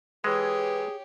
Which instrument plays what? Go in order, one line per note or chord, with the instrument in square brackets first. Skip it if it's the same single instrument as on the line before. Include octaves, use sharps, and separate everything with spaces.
[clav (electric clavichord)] E3 G#3 [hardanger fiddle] G4 C#5 [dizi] G#4 [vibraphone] B4